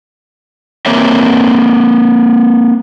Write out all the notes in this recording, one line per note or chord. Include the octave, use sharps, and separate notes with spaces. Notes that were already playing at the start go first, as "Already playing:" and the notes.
A#3 C4 A#4 C#5 E5